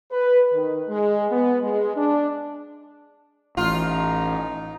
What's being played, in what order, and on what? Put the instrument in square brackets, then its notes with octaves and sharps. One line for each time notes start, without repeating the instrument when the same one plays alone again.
[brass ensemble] B4
D#3
G#3
B3
G#3
D4
[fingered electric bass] A1 [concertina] D#4 [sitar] F4